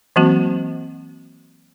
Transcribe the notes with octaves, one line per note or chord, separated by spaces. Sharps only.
E3 F#3 A#3 C4 F#4